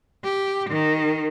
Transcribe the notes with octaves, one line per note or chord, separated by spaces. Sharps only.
G4
D#3